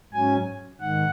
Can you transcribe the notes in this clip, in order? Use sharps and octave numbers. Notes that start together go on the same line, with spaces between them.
G#2 F#3 C#4 G#5
G#2 D#3 F#5